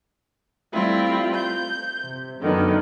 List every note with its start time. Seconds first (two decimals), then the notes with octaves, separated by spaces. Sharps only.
0.73 G3 A3 C4 E4 F4
1.34 G6
2.00 C3
2.39 F#2 D3 D#3 B3